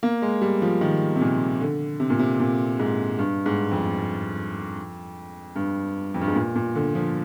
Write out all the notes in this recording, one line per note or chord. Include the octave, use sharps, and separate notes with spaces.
A#3
G#3
G3
F3
D#3
C3
A#2
D3
C3
A#2
C3
A#2
G#2
G2
G#2
F2
G2
F2
G2
G#2
A#2
A#2
D3
F3